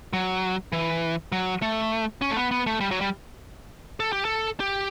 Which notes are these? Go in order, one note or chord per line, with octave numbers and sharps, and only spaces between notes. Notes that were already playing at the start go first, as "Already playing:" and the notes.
F#3
E3
F#3
A3
C#4
A3
B3
B3
A3
G3
F#3
G3
A4
G4
A4
G4